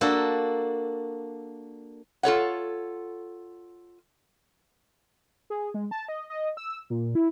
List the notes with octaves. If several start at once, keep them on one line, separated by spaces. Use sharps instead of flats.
A#3 D4 F#4 A4
F4 A4 C#5 F#5
G#4
G#3
A5
D#5
D#5
E6
A#2
E4